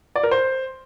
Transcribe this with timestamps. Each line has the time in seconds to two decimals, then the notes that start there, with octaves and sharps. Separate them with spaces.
0.16 D5
0.23 A#4
0.31 C5